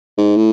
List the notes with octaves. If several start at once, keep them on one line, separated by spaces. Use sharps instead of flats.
G#2
A2